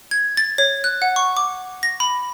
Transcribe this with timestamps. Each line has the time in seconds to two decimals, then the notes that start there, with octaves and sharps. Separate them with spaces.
0.11 G#6
0.37 A6
0.58 C#5
0.84 F#6
1.02 F#5
1.16 C#6
1.37 D6
1.83 A#6
2.00 B5